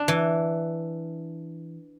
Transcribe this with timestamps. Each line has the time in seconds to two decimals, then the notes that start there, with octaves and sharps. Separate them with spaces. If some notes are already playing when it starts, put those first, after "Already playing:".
Already playing: D4
0.08 E3